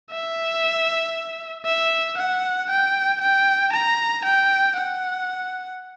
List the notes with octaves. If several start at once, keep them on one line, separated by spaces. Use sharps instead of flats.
E5
E5
F#5
G5
G5
A#5
G5
F#5